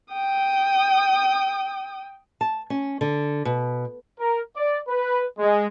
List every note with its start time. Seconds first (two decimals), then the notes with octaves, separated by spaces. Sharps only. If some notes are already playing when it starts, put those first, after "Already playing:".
0.13 G5 D#6
2.41 A5
2.70 C#4
3.01 D3
3.45 B2
4.19 A#4
4.56 D5
4.89 B4
5.39 G#3